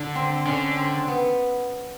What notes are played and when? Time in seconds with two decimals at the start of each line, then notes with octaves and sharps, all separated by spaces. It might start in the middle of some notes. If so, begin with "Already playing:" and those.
Already playing: D3
0.15 C4
0.45 D3 C#4
0.77 C4
1.08 B3